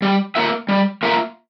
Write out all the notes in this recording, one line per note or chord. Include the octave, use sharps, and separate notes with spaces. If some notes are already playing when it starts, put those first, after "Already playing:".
G3
A#3 F4 A#4 E5
G3
A#3 F4 A#4 E5